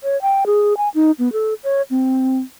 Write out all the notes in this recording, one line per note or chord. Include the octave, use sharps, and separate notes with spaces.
C#5
G5
G#4
G#5
D#4
B3
A4
C#5
C4